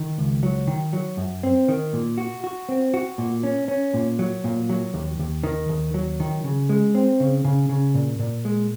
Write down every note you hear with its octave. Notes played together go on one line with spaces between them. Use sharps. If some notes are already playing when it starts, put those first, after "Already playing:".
Already playing: D#3
C#2
F#3
D#3
F#3
F#2
C4
D#3
A#2
F#4
F#4
C4
F#4
A#2
C#4
C#4
A#2
F#3
A#2
F#3
D#2
D#2
D#3
D#2
F#3
D#3
C#3
G#3
C4
C#3
C#3
C#3
A#2
A#2
G#3